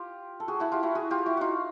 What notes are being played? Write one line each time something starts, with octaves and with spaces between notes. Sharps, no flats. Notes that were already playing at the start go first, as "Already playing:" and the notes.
Already playing: F4 G4
A4
F#4 G#4
E4 F#4
F4 G4
E4 F#4
F#4 G#4
F4 G4
E4 F#4
D#4 F4 F#4